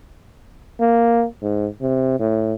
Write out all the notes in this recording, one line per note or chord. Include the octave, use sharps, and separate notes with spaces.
A#3
G#2
C3
A2